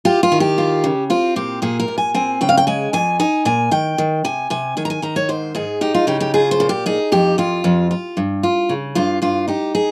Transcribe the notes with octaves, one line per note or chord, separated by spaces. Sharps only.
F4 G4
F4
D#3
G4
F4
C#3
C4 F4
A#2 G4
A#2 G#4
A#4
A#2
G#5
C4 G#5
C#3 G5
F5
G5
G#3 G#5
F2 G#5
D#4 G#5
A#2 G#5
D#3 G5
D#3
C3 G#5
C3 G#5
D#3 G#5
A#5
G#5
D#3 A#5
C#5
G#2 C5
G#2 G#4
D#4 G4
F4
C#3 G4
G4
F4 G#4
C5
A#2
G4
D#4 G#4
F2 G4
F2 F4
F2
F4
G2
F4
C#3
G2 F4
G2 F4
D#4 G4
G#4